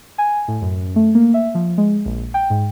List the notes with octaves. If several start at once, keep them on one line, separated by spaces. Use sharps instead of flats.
G#5
A2
F#2
A3
A#3
E5
F3
G#3
A#1
G5
G#2